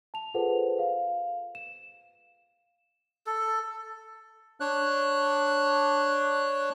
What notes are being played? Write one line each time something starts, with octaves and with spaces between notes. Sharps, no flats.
A5 F7
F4 G#4 A4 B4 C5 F#5
F5
E7
A4
D4 C#5 F#6